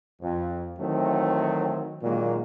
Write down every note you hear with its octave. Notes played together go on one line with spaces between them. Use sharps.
F2
D#3 E3 F#3 A3 C4
A#2 D3 D#3 F#3 G#3 A#3